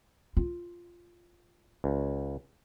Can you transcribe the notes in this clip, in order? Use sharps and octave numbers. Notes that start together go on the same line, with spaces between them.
F4
C#2